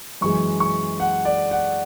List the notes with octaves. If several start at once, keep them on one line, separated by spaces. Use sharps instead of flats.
F#2 E3 G#3 C#6
C#6
F#5
D5
F#5